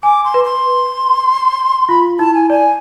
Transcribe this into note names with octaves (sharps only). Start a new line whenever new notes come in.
G#5 D6
C6
B4
C6
F4 B5
E4 A5
G#5
D5 G#5